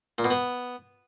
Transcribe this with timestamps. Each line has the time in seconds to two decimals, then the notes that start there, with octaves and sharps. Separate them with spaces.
0.18 A#2
0.24 B2
0.30 B3